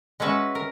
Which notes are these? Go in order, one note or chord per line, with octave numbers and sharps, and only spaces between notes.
G#3 C#4 F#4 B4 E5
A#4